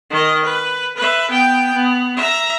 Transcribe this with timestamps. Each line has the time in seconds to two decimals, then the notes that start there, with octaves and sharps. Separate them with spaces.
0.10 D#3 D#5
0.44 B4
0.97 B4 E5
1.30 B3 G5
1.74 B3
2.16 E5 A#5